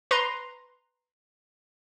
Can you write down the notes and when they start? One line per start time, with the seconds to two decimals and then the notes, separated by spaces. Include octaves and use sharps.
0.11 B4 A#5 C6